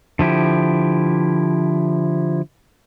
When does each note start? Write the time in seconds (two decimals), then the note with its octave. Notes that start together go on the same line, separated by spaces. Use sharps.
0.19 D3 F3 E4 G4